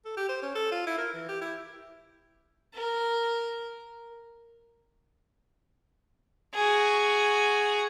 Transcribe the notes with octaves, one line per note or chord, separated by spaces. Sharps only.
A4
G4
C5
C#4
A4
F4
E4
A#4
E3
G4
E4
A#4
F#4 G#4